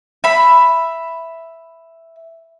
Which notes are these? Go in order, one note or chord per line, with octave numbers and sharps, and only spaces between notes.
E5 B5